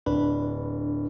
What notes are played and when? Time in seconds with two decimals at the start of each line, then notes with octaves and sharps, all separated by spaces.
0.06 D1 D4 B4